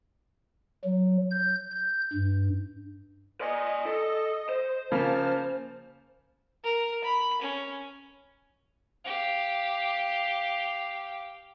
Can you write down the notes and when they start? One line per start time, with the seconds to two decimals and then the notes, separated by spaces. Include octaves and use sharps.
0.85 F#3
1.31 G6
1.71 G6
2.13 G2
3.41 D5 D#5 G#5
3.86 A4
4.49 C5
4.92 C#3 F3 A#3 A5 F6
6.64 A#4
7.04 B5
7.42 C#4
9.05 G4 F5